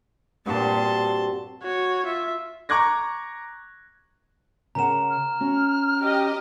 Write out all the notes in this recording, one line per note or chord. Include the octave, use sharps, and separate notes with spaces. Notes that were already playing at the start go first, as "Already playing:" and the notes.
G2 A#2 C4 F#4 A5 C6
F#4 C#5
F4 E5
A#5 C#6 D6 F#6 G#6 A#6
C#3 A#4 F#5 A#5 E7
F6
C#4 F#4
G4 D#5